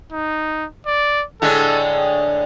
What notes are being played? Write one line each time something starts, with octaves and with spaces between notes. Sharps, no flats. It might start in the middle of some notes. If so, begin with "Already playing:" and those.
D#4
D5
A2 D3 G#3 A4
G#4